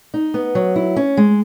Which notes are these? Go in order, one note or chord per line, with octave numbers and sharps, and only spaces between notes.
D#4
B3
F#3
E4
C#4
G#3